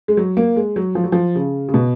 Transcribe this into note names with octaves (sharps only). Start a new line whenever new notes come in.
G#3
F#3
A#3
G#3
F#3
F3
F#3
F3
C#3
C#3
B2